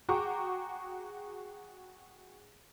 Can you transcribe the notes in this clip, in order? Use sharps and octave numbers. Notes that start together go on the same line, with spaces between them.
F#4 G#4 G5 A#5 C#6 D6